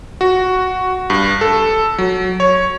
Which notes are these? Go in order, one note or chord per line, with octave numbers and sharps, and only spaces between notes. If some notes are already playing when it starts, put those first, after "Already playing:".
F#4
G2
A4
F#3
C#5